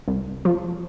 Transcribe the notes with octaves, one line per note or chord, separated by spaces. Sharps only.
C2
F3